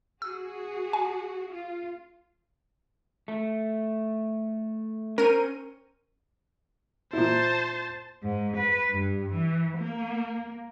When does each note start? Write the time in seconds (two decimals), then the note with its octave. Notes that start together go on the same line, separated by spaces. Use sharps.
0.22 F#4 G#4 E6
0.93 G#5
1.50 F4
3.28 A3
5.18 C#4 A#4 C5 C#5 D#7
7.13 A#2 E4 C5 A5
8.23 G#2
8.57 B4
8.90 G2
9.33 E3
9.78 A#3